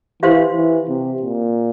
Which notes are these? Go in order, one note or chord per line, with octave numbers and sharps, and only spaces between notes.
E3 G4 C5 F5 C6
E3
C3
A#2